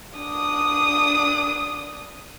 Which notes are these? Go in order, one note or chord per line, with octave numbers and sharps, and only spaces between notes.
D4 D#6